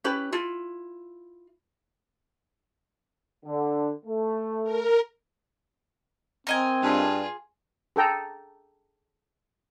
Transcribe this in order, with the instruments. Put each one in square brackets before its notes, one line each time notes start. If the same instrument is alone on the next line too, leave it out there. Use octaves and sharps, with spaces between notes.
[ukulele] C#4 E4 G4 B4
E4 F4
[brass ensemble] D3
A3
[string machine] A#4
[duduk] C4 [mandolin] A#4 D#5 G#5
[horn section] G2 [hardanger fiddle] F4 G#4
[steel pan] G#4 A4 G5 A#5